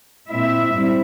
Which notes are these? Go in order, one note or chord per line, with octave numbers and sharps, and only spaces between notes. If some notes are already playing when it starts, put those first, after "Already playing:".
A#2 G#3 C4 E4 E5
G#2 G3 C4 E4